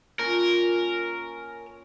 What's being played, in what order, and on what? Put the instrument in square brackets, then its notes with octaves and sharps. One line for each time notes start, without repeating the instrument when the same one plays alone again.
[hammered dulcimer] A#2 C#4 A5 [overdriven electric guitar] A#4